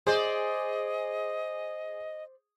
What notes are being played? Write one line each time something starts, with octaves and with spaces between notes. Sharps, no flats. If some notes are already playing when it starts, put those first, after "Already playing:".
G#4 C5 D5 D#5